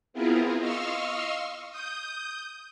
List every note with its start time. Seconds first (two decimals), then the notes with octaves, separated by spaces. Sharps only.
0.13 B3 C4 E4 F4 G#4 A#4
0.59 D#5 F5 C6 C#6 E6 F6
1.71 D#6 G6